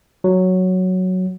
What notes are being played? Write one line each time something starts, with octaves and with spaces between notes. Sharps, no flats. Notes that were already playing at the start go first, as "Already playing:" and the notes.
F#3